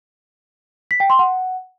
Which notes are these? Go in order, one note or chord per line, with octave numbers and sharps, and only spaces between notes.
B6
G5
C6
F#5